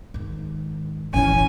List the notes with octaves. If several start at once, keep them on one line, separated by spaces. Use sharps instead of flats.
G#2 D#3
D#1 G#1 G#2 E3 C#4 G#5